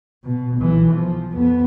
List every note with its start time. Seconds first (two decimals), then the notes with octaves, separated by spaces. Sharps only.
0.23 B2
0.57 B1 E3
0.93 F3
1.33 F2 B3